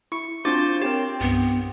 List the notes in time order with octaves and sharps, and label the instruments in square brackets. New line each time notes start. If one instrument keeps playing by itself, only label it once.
[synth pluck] E4 [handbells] C#6 C#7
[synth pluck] C4 D4 F#4 [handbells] F4 D6 A6 [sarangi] C5
[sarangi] C4 [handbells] G4 [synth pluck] A#4 C#5
[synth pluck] C2 G2 [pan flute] B3